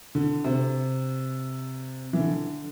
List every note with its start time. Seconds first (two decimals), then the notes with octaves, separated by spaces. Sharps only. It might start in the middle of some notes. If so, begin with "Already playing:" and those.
0.15 D3
0.44 C3
2.13 E3
2.20 D3